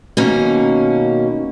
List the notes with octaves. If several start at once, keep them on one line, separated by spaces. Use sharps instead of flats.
B2 D#3 A#3 C#4